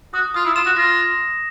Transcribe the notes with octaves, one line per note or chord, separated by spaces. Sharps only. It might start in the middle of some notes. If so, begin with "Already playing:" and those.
F#4 D#6
F4 D#6
E4
F4 E7
F#4
F4 A#6